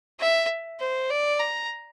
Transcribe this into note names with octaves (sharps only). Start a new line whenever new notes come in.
E5
C5
D5
A#5